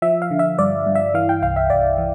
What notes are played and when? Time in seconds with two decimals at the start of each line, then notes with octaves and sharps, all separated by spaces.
0.02 F3 E5
0.22 F5
0.31 D3
0.39 E5
0.59 G2 D5
0.86 G2
0.95 E5
1.14 E3 F5
1.29 G5
1.43 C2 F5
1.56 E5
1.70 C2 D5
1.98 E3